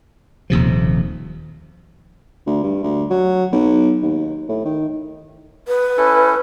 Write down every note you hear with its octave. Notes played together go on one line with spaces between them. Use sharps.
D#1 D#2 C3 F3
D2
G2
D2
F#3
B1
D#2
A2
D#3
B4
C#4 E4 A4